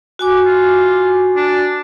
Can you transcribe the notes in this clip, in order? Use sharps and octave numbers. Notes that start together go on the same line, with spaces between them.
F#4 G#5 D6
F4
D4